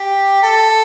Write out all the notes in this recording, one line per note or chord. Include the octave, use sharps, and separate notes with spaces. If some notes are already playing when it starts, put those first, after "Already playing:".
Already playing: G4
A4